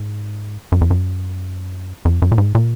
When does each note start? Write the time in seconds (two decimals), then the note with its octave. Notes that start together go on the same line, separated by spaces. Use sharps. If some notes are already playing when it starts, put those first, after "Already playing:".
Already playing: G#2
0.72 F#2
0.81 F2
0.91 F#2
2.05 F2
2.22 F#2
2.32 A#2
2.38 G#2
2.55 A#2